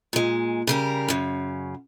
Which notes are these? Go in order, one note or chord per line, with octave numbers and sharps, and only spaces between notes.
A#2 G#3
C#3 G3 A#4
F#2 C#3